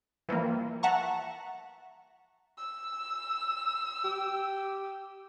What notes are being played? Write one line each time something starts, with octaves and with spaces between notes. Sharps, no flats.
E3 F3 G3 A#3
E5 F#5 A5 A#5 C#6
E6
G4